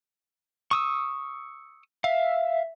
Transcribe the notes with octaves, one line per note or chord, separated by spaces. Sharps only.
C#6 D#6 E6
E5 F5